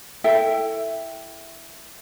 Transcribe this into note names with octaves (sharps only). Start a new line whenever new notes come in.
E4 A4 E5 G5